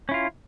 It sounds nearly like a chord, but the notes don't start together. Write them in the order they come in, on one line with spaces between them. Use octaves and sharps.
C#4 E4 F4